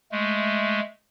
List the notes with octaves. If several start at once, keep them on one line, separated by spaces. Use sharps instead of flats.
G#3 A3